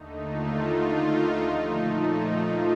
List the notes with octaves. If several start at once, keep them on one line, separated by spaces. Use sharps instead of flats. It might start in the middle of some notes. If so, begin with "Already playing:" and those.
Already playing: D#2 D3 A3 D#4
F4
D#4
D#4
A#2 F3 A3
D#4
F4